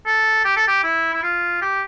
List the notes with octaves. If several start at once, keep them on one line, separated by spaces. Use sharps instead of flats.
A4
G4
A4
G4
E4
E4
F4
G4